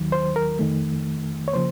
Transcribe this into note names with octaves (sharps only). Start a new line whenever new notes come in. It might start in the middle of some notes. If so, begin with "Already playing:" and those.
Already playing: D#2 D#3 F#3
C5
A#4
F2 D#3 A3
C#5
C#3 F3 A#3 C5